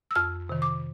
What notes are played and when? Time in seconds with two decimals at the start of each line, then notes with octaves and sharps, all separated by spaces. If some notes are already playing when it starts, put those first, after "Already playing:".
0.11 E6
0.16 F2 F6
0.49 C3 D#3
0.62 D6